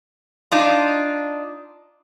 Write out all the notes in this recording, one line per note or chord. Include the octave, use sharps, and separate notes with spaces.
D4 D#4 F4